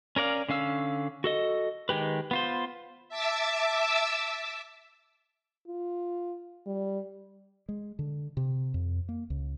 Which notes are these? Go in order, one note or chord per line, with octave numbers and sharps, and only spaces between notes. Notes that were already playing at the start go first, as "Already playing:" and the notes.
C#4 A#4 D5 F5
D3 C#4 F5 E6
F#4 A4 D#5
D#3 G#3 G4 B4
B3 F4 C5
E5 A5 D6 E6
F4
G3
G#3
D3
C3
F2
A#3
C#2